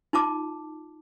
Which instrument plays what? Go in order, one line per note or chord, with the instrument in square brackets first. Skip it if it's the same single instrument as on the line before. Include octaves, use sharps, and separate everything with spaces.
[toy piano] D#4 F4 A5 D6